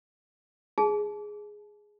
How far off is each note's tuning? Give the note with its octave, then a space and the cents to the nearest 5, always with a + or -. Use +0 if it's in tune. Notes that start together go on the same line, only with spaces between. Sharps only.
G#4 +0 A5 -40